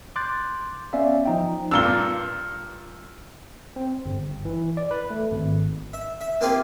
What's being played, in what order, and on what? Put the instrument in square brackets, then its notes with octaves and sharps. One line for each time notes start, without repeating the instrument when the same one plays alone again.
[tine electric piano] C6 D6 F#6 G6 A6
B3 C#4 D5 E5 F5
F3 D#4 G5
[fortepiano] G2 A#2 D4 [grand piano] E6 G7
[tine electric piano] C4
G1
E3
D5
B4
A3
G#1
[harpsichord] E5
E5
A#3 C4 F4 G4 G#4